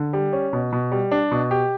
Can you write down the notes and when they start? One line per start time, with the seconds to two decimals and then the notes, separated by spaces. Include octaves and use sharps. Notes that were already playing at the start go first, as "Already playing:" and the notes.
Already playing: D3
0.13 G3
0.33 C#4
0.53 B2
0.73 B2
0.92 G3
1.11 D4
1.31 B2
1.51 G4